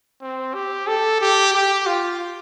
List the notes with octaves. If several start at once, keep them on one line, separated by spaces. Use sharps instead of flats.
C4
G4
A4
G4
G4
F4